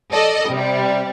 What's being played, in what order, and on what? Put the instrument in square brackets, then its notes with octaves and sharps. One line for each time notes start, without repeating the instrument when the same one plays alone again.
[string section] A4 D5 D#5
C3 G3